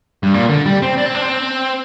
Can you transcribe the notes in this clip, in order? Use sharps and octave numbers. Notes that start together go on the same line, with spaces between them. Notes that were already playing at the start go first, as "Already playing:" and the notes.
G2
A#2
D3
G3
C4
D4
C4
D4
C4